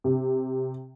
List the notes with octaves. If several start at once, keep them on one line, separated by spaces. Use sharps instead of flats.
C3